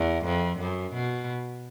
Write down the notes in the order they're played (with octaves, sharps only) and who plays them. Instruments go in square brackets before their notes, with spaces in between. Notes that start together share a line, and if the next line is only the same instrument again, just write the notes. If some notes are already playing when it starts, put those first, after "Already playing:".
Already playing: [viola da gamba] E2
F2
F#2
B2